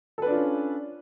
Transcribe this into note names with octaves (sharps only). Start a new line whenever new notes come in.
C#4 D4 F4 A4 B4